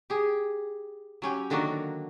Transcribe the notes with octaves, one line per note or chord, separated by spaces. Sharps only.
G4 G#4
F#3 C#4 G4
D3 D#3 F#3 A#3 D4 F#4